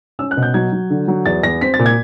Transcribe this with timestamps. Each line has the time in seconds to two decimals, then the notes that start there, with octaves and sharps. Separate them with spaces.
0.19 C#4 E6
0.31 F#6
0.37 B2
0.43 G6
0.54 F#3 G#6
0.72 F#3
0.90 D3
1.08 F#3
1.26 E2 A6
1.43 E2 A#6
1.61 C4 B6
1.74 A6
1.79 A#2
1.86 G#6